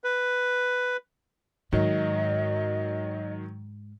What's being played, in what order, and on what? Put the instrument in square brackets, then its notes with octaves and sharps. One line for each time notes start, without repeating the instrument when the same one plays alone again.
[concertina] B4
[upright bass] G#2 [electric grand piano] D#3 F#3 [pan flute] D#5